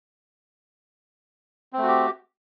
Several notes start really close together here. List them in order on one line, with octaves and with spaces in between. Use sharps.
C4 A3 F#4 G4